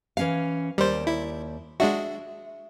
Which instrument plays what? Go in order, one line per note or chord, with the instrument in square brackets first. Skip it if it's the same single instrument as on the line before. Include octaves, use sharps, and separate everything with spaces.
[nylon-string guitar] E3 C#4 F5
[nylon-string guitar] D#2 D5 [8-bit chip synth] G3 C5
[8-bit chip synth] E4
[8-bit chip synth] G#3 D4 F#4 [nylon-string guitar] E5